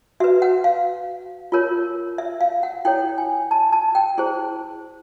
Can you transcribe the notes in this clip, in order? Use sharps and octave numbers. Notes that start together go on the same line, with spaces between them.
F#4 B4 E5
F#5
F5
F4 A#4 C#5
E5
F5
F#5
E4 A4 C#5 G5
G#5
A5
A5
G5
E4 G#4 C5